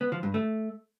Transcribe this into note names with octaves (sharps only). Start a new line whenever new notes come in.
B3
F3
G2
A3